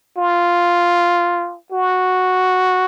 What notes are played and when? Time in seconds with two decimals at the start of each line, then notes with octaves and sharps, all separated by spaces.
0.17 F4
1.72 F#4